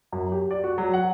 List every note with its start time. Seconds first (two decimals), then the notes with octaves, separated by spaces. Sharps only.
0.12 F#2
0.32 G4
0.51 D5
0.64 F#4
0.78 F#3
0.93 F#5